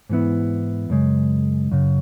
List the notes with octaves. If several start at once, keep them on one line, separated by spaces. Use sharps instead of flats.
G#2 E3 B3 E4
F#2 C#3 G#3
F#2 C#3